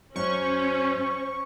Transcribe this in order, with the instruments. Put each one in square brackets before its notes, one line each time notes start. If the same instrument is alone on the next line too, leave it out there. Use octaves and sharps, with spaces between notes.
[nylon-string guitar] F#2 [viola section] C#4 [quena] C5 [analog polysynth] C#6